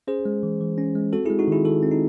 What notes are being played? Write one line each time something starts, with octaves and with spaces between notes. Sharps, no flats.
C#4 G#4 C5
G#3
E3
E3
C#4
G#3
C4 F#4 A4
G#3 E4 G#4
D#4 F#4
D#3 E4 G#4
D#3 F#4 A4
C4
D#4